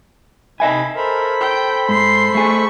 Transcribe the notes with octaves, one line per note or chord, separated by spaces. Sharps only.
C3 D#4 D#5 E5 G#5 B5
A4 A#4 C5 B5
G5
G#2 C6 C7
A3 G#4 C#6